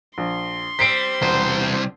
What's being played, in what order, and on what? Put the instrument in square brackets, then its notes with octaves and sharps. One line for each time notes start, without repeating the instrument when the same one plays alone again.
[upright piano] A#1 [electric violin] C6
[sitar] G3 C4 [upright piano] B6 C7 D7
[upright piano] E1 [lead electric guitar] C2 C5